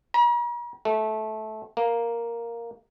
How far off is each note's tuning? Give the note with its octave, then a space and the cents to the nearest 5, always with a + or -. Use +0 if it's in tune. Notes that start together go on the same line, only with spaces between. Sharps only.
A#5 +45
A3 -20
A#3 +0